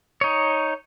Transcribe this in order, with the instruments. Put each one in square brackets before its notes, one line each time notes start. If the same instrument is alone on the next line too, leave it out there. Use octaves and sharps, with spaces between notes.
[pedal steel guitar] D#4 C#5